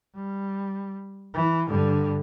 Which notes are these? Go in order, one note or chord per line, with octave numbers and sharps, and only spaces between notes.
G3
E3
G2 D3